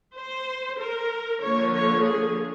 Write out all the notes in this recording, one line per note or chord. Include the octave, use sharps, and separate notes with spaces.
C5
A#4
D3 F3 A#3 C#5
C#5
G#4